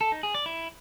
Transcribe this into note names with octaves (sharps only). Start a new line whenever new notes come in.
A4
D#4
G#4
D5
E4